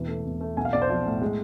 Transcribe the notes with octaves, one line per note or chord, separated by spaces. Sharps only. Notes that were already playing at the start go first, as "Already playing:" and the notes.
Already playing: E1 E3
A3
E1
A3
B1 G#5
F5
B1 D5
C5
F3 D5
A2
G#3